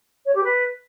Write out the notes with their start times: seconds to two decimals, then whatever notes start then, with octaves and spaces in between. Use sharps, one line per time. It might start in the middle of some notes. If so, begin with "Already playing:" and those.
0.24 C#5
0.33 G4
0.42 B4